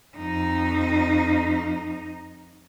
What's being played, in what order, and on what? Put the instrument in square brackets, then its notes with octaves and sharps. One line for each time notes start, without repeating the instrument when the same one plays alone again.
[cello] F2 D#4